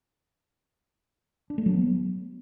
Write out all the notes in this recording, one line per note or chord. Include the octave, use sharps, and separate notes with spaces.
D4
A3
F#3
B3